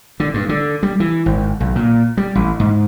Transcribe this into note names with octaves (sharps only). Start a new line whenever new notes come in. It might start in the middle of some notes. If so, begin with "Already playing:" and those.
D3
G2
D3
G3
E3
G#1
B1
A#2
G3
A1
G#2